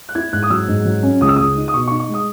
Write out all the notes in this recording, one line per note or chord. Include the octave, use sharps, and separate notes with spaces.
F#6
E4 G#6
G#2 F#6
D#6
F#3 E6
G#2
F#3
C#4
C#2 D#6
E6
C#2 D#6
D#4
D#6
B2 C#6
C#6
D#4
C#6
G#3
D#6